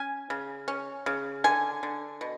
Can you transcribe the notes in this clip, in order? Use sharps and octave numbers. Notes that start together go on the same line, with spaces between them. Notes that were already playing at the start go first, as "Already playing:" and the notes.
Already playing: C#4 G#5
C#3
C#4
C#3
D3 G#5
D3
B2